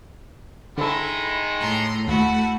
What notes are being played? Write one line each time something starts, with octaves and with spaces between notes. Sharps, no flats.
D3 D#3 G#3 E4 A4
A2 A#5 C6
D#2 A3 E4 F#4 F#5